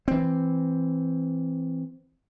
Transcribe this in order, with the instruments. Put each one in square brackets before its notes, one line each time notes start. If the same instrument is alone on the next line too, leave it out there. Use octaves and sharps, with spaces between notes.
[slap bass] E3 C4